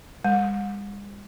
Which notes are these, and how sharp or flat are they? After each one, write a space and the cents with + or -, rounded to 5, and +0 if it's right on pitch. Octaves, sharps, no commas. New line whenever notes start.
G#3 -45